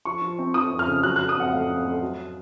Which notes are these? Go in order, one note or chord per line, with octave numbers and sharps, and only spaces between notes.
F3 C#6
F3
C4
F3 D#6
F2
F6
C#3
F#3 F#6
F#6
F#3
D#6
F2 F#5
A3 F5
F2
A3
F#3